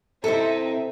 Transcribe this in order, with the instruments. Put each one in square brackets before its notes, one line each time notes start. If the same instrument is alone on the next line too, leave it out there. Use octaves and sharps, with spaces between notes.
[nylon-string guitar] C3 E4 C5 [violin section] C4 D#4 E5 [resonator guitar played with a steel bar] A4